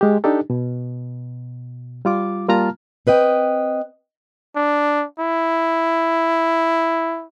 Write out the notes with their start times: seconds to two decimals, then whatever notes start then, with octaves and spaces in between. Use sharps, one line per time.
0.01 G#3 G4
0.24 D4 D#4 G4 A4
0.50 B2
2.05 G3 F4 D6
2.48 G3 A#3 F4 A5 A#5 F6
3.07 C4 B4 D#5 G5
4.56 D4
5.19 E4